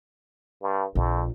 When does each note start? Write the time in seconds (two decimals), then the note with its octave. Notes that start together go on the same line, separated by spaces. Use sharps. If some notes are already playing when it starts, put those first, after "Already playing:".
0.61 G2
0.95 A#1 F2